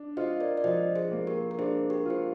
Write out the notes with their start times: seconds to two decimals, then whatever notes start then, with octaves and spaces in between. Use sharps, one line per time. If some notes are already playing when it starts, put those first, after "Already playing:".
Already playing: D4
0.17 F4 C5 D#5
0.41 A#4 D5
0.57 D5
0.64 F3 C5 D#5
0.96 G#4 C5
1.11 A#3
1.27 G4 A#4
1.51 A#4
1.58 D4 G#4 C5
1.90 G4 A#4
2.06 F4 C5